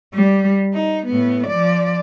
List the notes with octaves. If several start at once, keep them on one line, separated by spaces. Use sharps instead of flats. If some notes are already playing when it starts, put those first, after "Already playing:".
G3
D#4
A2 B3
F3 D5